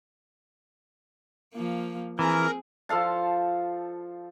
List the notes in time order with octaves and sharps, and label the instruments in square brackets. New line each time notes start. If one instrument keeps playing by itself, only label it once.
[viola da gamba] F3 A#3
[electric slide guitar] E3 [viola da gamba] C4 G#4 [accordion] A#4
[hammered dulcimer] F3 A4 F5 A5